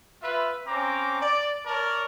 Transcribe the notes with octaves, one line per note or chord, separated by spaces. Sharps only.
F4 B4 E5
C4 C#4 A#5 D6
D5
A#4 C#5 D5 A5